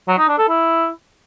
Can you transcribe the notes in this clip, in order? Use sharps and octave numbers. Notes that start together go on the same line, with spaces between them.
F#3
D#4
D4
A4
E4